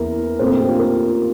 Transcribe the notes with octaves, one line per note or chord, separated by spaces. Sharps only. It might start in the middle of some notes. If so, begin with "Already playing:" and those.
Already playing: E2 E3 A#3 A#4
A#2 A3 C4 C5
A#4
G4
F4
A#4